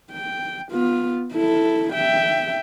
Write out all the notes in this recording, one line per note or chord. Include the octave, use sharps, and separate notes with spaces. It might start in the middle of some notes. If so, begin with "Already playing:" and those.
G5
B3 F4
E4 A4
E5 G5